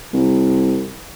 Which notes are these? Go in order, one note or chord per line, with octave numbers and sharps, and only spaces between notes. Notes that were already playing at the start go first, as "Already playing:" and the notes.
C2